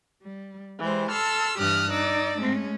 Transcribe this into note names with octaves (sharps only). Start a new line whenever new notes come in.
G3
E3 G3 G#3 C5
A4 C6 E6 F6
G2 E3 G4 D#6 F6 F#6
D#4 D5 D6 E6
G#3 A3 C#4